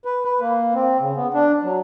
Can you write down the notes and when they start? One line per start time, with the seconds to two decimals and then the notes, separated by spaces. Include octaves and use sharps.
0.05 B4
0.25 B4
0.41 A#3
0.75 C4
1.00 C#3
1.16 B3
1.34 D4
1.64 F#3